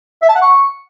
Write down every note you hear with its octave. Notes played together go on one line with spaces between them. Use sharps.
E5
A5
F#5
C#6